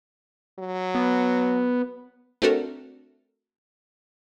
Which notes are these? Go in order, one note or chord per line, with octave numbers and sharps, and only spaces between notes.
F#3
B3
A3 C4 D4 F#4 A4 A#4